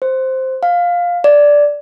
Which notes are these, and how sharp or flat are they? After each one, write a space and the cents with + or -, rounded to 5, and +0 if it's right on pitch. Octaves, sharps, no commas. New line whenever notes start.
C5 +0
F5 +10
D5 -5